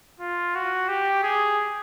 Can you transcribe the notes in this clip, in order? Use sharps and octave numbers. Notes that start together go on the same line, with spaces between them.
F4
F#4
G4
G#4